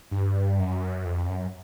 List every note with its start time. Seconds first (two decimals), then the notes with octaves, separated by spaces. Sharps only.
0.11 G2
0.59 F#2
1.05 F2
1.28 F#2